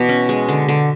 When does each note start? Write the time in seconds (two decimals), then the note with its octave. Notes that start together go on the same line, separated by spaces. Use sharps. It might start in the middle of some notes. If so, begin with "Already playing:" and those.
Already playing: B2 E3 B4 D5
0.09 C#4
0.29 G#3
0.49 D3
0.68 D3